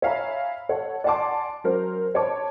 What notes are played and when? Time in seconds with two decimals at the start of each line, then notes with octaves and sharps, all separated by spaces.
0.02 C#5 E5 F5 G#5 A#5 B5
0.69 A4 C#5 F#5
1.04 D5 F#5 G#5 A5 C6 D6
1.64 F#3 C#4 A#4 C5
2.14 C5 C#5 A5 D6